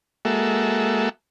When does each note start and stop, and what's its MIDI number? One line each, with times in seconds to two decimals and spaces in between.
0.25 1.09 56
0.25 1.09 58
0.25 1.09 66
0.25 1.09 69
0.25 1.09 76